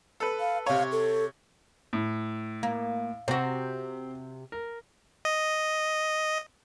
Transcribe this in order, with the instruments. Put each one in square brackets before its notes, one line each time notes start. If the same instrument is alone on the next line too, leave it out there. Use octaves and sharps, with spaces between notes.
[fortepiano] A4 B4
[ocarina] F5
[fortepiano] C3 C#5 [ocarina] F5
[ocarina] A4
[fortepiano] A2
[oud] A#3
[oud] C3 F#4 [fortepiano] C4
[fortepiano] A#4
[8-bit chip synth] D#5